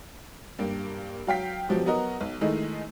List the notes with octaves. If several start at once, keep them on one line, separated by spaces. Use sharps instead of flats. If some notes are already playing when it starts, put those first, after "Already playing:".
G2 A#3 G4
F#3 F5 G5 B6
B2 F3 F#3 G4
F#3 B3 F#4 A#4 D#5
B1
D#3 G#3 A3 D#4 E4